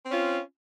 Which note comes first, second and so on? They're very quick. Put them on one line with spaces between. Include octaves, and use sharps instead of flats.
C4 C#4 F4